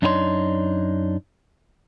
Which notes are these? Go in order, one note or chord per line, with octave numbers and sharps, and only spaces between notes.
F#2 D4 D#4 F4 C#5 C6